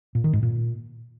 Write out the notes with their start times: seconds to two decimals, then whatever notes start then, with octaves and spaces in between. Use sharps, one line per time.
0.15 A#2
0.24 D#3
0.33 G#2
0.43 A#2